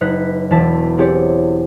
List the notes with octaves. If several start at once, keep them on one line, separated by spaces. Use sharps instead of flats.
F#1 D#4 B4 F#6 B6
E1 E2 D5 A5 B6
C4 E4 G4 G#4 C#5 D5